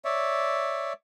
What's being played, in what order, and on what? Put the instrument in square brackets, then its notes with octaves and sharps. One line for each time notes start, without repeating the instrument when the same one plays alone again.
[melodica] C#5 D5 E5